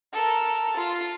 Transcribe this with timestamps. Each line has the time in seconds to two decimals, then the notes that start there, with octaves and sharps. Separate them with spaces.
0.13 A4 A#4
0.77 F4